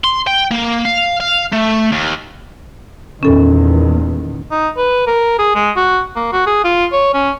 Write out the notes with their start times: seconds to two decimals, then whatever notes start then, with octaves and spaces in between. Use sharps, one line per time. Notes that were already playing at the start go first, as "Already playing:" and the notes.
0.05 C6
0.27 G5
0.51 A#3
0.85 F5
1.20 F5
1.52 A3
1.92 D#2
3.23 E2 A#2 D#3 C#4 A4
4.51 D#4
4.77 B4
5.07 A#4
5.38 G#4
5.55 G#3
5.76 F#4
6.15 A#3
6.32 F#4
6.46 G#4
6.64 F4
6.92 C#5
7.14 C#4